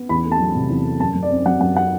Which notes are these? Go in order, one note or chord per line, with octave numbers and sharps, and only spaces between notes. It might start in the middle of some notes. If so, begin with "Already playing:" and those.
Already playing: B3
E2 B5
A3
A5
F#3
C3
E2
A3
F#2 A5
F#2
D5
C4
F#3 F#5
F#2 F#5
F#5